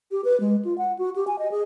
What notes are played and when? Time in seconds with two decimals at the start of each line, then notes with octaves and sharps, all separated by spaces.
0.11 G4
0.24 B4
0.40 G#3
0.65 F4
0.78 F#5
0.98 F#4
1.16 G4
1.27 G#5
1.39 D#5
1.51 G#4